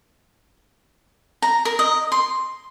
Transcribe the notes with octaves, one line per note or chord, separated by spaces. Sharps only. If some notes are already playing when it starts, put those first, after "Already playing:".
A#5
A#4
D#5
C6